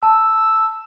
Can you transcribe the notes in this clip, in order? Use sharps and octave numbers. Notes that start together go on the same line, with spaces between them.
A5 E6